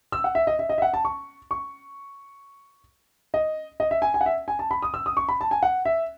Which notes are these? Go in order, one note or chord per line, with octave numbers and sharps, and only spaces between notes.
E6
F#5
E5
D#5
E5
D#5
E5
F#5
A5
C#6
C#6
D#5
D#5
E5
G#5
G#5
F#5
E5
G#5
A5
B5
D#6
E6
D#6
C#6
B5
A5
G#5
F#5
E5